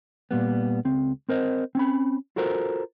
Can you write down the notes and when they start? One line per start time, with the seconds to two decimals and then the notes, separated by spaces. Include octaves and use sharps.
0.31 A#2 G3 B3
0.85 C#2 C4
1.29 C4 A#4 C5 D#5
1.75 C4 C#4 B5
2.36 F4 F#4 A4 A#4 C5